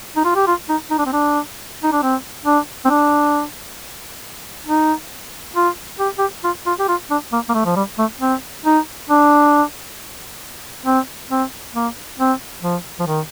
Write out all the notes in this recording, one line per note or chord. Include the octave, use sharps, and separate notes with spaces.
D#4
F4
G4
F4
D#4
D#4
D4
C4
D4
D#4
D4
C4
D4
C4
D4
D#4
F4
G4
G4
F4
F4
G4
F4
D4
A#3
A#3
A3
F3
G3
A3
C4
D#4
D4
C4
C4
A#3
C4
F3
F3
D#3